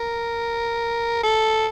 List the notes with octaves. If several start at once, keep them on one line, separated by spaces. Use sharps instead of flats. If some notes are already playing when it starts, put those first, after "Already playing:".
Already playing: A#4
A4